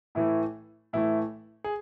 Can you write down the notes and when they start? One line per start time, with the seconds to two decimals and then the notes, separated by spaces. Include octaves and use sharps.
0.15 A2 E3 A3 E4
0.93 A2 E3 A3 E4
1.64 G#4